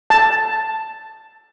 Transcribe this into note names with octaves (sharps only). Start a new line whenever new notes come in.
A5